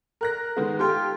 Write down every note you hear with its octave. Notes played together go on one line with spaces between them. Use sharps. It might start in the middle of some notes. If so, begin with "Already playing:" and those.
A#4 F#6 A#6
D#3 G#3 B3
F4 G4 A4 G5